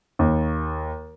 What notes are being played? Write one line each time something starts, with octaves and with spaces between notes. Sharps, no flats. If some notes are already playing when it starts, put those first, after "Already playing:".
D#2